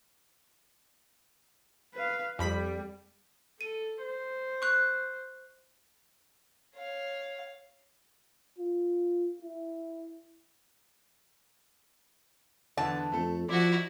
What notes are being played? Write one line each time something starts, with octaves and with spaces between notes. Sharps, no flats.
B4 F5
F2 G3 B5 B6
A4 D#7
C5
C#6 F#6
C#5 F5
F4
E4
E2 D3 E3 A5
F2 A3 A4
F3 E4 F#4 D5